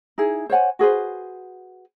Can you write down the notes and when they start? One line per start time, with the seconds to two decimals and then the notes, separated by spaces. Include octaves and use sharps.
0.18 D#4 E4 G#4
0.50 C5 C#5 F#5 G#5
0.79 F#4 G#4 B4 C5